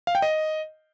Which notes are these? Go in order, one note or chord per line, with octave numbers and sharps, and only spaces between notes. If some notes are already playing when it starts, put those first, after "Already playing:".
F5
G5
D#5